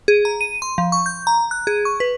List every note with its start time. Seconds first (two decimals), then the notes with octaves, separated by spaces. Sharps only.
0.08 G#4
0.25 A#5
0.41 D#7
0.62 C6
0.78 F3
0.92 C#6
1.06 G6
1.27 A#5
1.51 F#6
1.67 G#4
1.85 C#6
2.00 B4